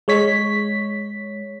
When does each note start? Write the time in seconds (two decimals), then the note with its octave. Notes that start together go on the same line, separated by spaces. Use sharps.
0.08 G#3 C#5 B6